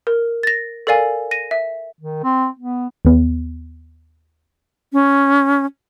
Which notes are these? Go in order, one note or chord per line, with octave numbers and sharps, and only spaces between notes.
A#4
A6 A#6
A4 A#4 D5 F5 G#5
A#6 D#7
E5
D#3
C4
B3
D#2 B3
C#4